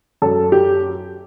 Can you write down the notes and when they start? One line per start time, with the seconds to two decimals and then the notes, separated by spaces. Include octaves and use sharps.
0.22 F#2 A4
0.52 G4